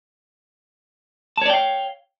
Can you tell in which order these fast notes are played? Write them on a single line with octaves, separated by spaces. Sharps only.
A5 C#5 D5 G5 F5